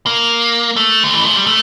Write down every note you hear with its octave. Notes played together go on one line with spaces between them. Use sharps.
A#3
A3
D3
E3
F3
G3
A3